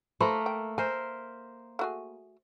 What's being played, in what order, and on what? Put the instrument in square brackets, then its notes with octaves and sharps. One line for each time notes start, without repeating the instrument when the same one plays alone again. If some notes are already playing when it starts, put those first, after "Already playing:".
[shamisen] E3 C5 B5 [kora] A3 A#3 A#4
[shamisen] G5
[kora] A#4 C5 E5 [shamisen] G#5
[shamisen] A3 F#4 G#4